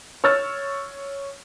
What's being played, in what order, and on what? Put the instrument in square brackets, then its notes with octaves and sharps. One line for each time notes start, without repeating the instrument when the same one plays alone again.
[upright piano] C#5 E6 F6 A6